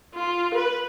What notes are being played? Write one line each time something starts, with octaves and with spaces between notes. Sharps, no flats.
F4
B4